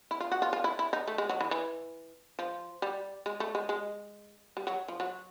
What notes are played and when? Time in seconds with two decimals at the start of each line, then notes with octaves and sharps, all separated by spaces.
0.11 E4
0.20 F4
0.32 F#4
0.42 F4
0.53 F4
0.64 E4
0.79 E4
0.93 D#4
1.08 A3
1.18 G#3
1.29 F#3
1.41 E3
1.51 E3
2.39 F3
2.82 G3
3.26 G#3
3.40 A3
3.55 G#3
3.69 G#3
4.57 G3
4.67 F#3
4.88 F3
5.00 F#3